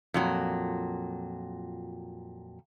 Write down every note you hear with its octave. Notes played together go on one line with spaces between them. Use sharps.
F2 A#2 F#3